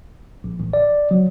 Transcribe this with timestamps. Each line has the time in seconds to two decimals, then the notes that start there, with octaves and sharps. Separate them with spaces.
0.44 A#1
0.60 A1
0.73 D5
1.11 F#3